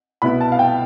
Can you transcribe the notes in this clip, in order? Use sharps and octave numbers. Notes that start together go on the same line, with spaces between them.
C2 B2 B3 E4 B5
A5
F5
G5